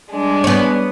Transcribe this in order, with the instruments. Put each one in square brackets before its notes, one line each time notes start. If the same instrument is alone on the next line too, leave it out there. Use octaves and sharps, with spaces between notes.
[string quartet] G3 G#3 D4
[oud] B3 C#5